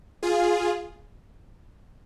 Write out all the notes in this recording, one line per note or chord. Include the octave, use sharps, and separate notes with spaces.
F4 G#4